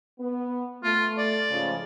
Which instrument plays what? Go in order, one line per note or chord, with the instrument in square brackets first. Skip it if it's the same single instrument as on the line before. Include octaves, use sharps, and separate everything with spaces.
[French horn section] B3
[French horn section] A3 [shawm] F4
[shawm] D5
[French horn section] G#2 C#3 F3